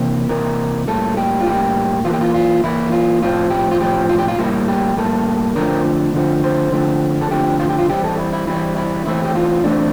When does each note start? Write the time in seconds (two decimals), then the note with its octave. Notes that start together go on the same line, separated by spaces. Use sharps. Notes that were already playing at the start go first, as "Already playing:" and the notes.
Already playing: C3 E3 A#3
0.29 C3 E3 A#3 A#4
0.88 A2 G3 A#3 A4
1.17 G4
1.41 F4
1.46 A2 G3 A#3 G4
2.05 E3 F4
2.09 A#3 G4
2.21 F4
2.34 F4
2.64 E3 A#3 E4
2.92 F4
3.22 A2 F3 C4 F4
3.50 G4
3.71 F4
3.80 A2 F3 C4 G4
4.09 F4
4.18 G4
4.28 F4
4.39 A2 G3 A#3 E4
4.68 G4
4.97 A2 G3 A#3 A4
5.56 D3 F3 A3 C4 A#4
6.14 D3 F3 A3 C4
6.44 C5
6.72 D3 F3 A3 C4
7.21 A4
7.31 D3 F3 A3 C4 G4
7.60 F4
7.69 G4
7.79 F4
7.90 E3 G3 C4 G4
8.04 A4
8.18 E4
8.33 E4
8.47 E3 G3 C4 E4
8.76 E4
9.06 E3 A3 C4 E4
9.25 G4
9.35 F4
9.64 E3 A3 C4 D4